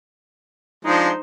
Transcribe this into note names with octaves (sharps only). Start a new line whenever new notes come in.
F3 G#3 D4 D#4 C5